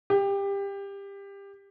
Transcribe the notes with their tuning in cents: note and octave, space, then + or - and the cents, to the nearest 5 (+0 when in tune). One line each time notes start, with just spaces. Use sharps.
G4 +20